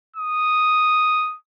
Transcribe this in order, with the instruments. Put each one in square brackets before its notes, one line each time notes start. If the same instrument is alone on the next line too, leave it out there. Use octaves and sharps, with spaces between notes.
[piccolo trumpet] D#6